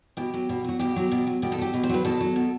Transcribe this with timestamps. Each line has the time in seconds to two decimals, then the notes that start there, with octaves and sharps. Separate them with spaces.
0.17 B2 G4
0.34 F#3
0.49 B2
0.64 F#3 F#4
0.79 B2 G4
0.96 F#3
1.12 B2
1.27 F#3
1.42 B2 G4
1.52 A4
1.58 F#3 G4
1.73 B2
1.83 C5
1.89 F#3 B4
2.05 B2 A4
2.20 F#3
2.36 B2